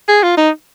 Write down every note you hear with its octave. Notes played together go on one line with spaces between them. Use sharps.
G#4
F4
D#4